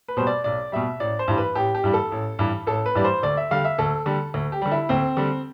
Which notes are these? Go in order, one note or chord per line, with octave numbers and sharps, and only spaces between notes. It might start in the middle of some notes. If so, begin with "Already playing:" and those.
B4
B2 G3 C5
D5
B1 D5
B2 G3 E5
A1 D5
C5
G2 E3 G3
B4
A1 G4
G4
G2 E3 G3
A4
A1
G2 E3 G3
A1 A4
B4
G2 E3 G3 D5
C5
D2 D5
E5
D3 G3 F5
E5
D2 A4
D3 G3
D2
G4
D3 G3
E4
D2 C4
D3 G3